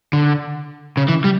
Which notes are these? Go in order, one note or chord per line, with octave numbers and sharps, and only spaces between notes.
D3
C#3
E3
G3